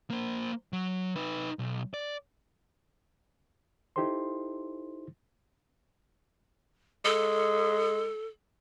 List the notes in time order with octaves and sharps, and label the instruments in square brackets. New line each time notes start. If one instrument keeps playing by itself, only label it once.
[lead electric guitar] A#3 C5
F#3
D#4 B4
B1
D5
[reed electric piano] D#4 E4 G4 A4 C5 C6
[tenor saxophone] G#3 [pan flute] A4